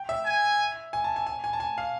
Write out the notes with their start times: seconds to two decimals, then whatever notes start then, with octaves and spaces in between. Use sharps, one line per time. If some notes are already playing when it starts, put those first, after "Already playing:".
Already playing: G5
0.09 E5
0.26 G#5
0.93 G#5
1.04 A5
1.16 G#5
1.27 G#5
1.44 G#5
1.53 A5
1.60 G#5
1.78 F5